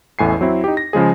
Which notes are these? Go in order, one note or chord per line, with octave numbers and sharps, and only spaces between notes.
A1 E2 A2 G#5 C7
F#3 C4 E4
D#4 G4
A#6
C#3 F3 G#3 G#4